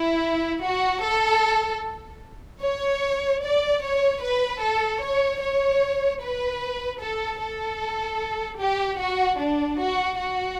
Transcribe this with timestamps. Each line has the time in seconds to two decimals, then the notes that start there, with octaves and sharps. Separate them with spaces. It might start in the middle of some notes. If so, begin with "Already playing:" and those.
Already playing: E4
0.64 F#4
1.04 A4
2.62 C#5
3.42 D5
3.82 C#5
4.22 B4
4.61 A4
5.01 C#5
5.41 C#5
6.20 B4
7.00 A4
7.40 A4
8.59 G4
8.98 F#4
9.38 D4
9.78 F#4
10.18 F#4